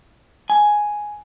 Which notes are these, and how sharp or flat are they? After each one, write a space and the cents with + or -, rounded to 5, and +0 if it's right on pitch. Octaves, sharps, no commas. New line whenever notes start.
G#5 +5